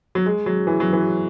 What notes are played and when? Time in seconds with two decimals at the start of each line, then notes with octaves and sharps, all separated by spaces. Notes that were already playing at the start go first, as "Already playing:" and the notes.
0.15 F#3
0.26 G#3
0.46 F#3
0.67 E3
0.80 F#3
0.93 E3